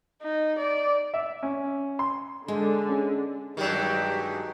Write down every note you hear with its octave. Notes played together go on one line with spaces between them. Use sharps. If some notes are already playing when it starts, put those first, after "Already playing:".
D#4
D5
E5
C#4
C6
D3 G#3
C#4 G#4
G2 D#3 F#3 G#3 G4